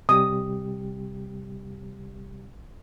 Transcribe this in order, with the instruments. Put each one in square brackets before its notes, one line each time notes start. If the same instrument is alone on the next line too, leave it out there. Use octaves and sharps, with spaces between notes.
[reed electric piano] C3 G3 G4 [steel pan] D#6